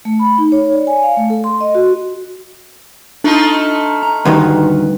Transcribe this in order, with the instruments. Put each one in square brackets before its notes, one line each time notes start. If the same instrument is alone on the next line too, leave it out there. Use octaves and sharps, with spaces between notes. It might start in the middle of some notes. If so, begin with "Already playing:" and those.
[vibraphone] A3
B5
D#4
C#5
D5
G#5
F5
A3
A4
C6
D#5
F#4
[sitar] A3 D#4 F4 [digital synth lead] D4
[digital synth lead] A#5
[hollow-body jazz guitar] D2 G2 D#3 [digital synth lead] B4